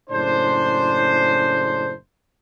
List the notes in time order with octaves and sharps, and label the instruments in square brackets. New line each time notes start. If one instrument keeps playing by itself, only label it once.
[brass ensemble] F#1 A2 C#3 D4 C5